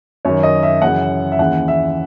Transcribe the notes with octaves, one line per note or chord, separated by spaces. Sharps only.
F#2 D#3 C#5
D#5
E5
F#2 C#3 E3 F#5
E5
D#2 C#3 E3 F#5
E5